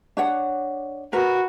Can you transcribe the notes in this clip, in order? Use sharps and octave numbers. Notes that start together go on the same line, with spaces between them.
D4 C#5 F#5
F#4 A#4 B4